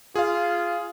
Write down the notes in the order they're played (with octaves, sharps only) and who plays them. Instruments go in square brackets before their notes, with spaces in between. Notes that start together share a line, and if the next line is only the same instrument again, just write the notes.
[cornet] F4 [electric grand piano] G#4 F5